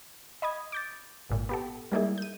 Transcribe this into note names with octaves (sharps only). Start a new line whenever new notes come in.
D#5 B5 D#6 G#6
D6 G6 A6
G#1 A#2
B3 G4 A4
G3 G#3 A#3 D#4 E4 G#4
G6 D#7